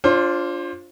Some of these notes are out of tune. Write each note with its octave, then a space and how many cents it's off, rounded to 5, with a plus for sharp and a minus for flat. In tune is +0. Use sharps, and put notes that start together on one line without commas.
D4 -15 F4 +0 C5 +30